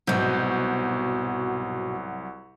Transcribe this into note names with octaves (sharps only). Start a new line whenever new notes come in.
C2 G#2 B2 F#3 G6